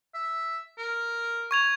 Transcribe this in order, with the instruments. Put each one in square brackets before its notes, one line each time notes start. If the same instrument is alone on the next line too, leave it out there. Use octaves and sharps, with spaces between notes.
[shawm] E5
A#4
[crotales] C#6 G#6 F7